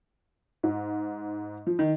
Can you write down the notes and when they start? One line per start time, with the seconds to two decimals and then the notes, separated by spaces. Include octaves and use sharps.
0.63 G#2
1.67 F3
1.79 D#3